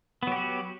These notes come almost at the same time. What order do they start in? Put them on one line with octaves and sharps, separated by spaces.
B3 F#3 G4 F#4